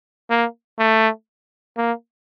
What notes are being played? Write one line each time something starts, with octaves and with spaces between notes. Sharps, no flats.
A#3
A3
A#3